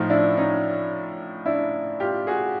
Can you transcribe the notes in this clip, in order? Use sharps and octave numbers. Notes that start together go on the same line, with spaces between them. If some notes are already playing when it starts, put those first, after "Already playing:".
Already playing: A2 F3 D#4 F4
D4 E4
C#4 D#4
D4 E4
F4 G4
F#4 G#4